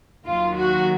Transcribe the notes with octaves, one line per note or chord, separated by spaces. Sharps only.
D#2 D#3 F#3 F4
F#4